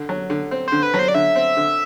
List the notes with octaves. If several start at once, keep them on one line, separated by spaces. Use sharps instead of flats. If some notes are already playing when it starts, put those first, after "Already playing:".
Already playing: D3
F#3
D3
C4
D3 C5
B4
F#3
C5
D5
D3 E5
C4
D3